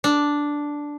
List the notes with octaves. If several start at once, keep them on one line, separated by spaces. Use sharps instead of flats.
D4